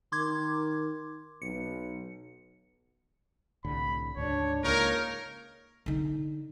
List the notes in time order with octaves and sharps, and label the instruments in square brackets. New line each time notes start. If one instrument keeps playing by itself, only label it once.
[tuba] D#3 [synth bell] C6 D6 G#6
[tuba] B1 [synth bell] C#7
[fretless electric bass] C2 A2 D3 [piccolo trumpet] B5
[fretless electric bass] D2 G#2 C#3 [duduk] D4 [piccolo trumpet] C#5
[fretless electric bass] C#2 [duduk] A#3 [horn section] D#4 A#4 [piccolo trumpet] C#5
[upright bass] D3 D#4